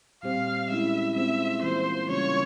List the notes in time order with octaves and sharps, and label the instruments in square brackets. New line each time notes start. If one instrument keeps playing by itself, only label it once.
[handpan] A#2 G3 C4 G4 C5 [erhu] F5
[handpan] G#3 C#4 E4 [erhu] E5
[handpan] G#3 C4 F4 G#4 C5 [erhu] E5
[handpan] E3 A#3 F4 [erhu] C5
[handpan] C#3 G3 A#3 C#4 F4 [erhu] C#5